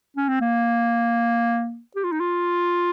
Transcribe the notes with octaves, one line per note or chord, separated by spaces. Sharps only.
C#4
C4
A#3
G4
F4
D#4
F4